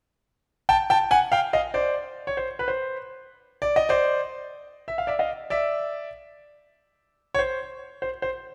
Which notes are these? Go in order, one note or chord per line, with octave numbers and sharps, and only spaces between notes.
G5 A5
G5 A5
F#5 G#5
F5 G5
D#5 F5
C5 D5
C#5
C5
B4
C5
D5
D#5
C5 D5
E5
F5
D5 E5
D#5 F5
D5 E5
C#5
C5
C5
C5